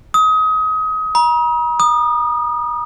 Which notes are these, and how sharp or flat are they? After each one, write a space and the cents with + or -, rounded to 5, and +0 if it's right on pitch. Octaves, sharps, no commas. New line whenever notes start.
D#6 +30
A#5 +45
D#6 -30